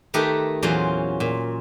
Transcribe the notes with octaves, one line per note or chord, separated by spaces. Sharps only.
D#3 A3 D#4 G4 A#4 B4
E2 A#2 F#3 C#4 F4 C5
A#2